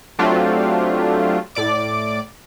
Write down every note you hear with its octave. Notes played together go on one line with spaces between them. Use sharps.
F#3 A3 C4 D4 F4 G4
A2 D5 D6